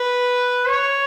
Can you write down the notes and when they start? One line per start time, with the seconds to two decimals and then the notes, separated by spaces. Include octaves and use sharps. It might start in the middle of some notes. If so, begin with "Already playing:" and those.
Already playing: B4
0.68 C#5